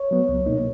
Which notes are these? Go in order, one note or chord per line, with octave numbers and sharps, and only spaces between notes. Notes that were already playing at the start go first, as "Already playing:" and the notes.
Already playing: C#5
F#3 B3
C#2
B2 A#3 D#4